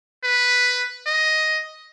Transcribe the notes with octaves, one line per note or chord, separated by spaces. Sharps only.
B4
D#5